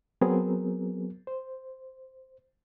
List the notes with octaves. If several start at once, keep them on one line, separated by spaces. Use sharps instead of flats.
F#3 B3 C4 G#4 A#4
C5